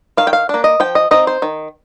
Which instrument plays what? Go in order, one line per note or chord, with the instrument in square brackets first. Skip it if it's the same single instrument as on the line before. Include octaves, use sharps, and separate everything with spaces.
[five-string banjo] D#3 F5
G5
F5
A#3 D4
D#5
F3 G5
D#5
C4 D#4 D#5
C5
D#3